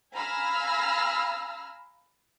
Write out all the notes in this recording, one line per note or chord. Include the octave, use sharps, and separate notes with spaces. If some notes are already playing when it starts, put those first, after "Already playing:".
F5 G#5 A#5 B5 E6 F6